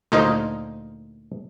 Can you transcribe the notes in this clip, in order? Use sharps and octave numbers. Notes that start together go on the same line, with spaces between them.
D2 A#2 D#4 A#4 C5 D#5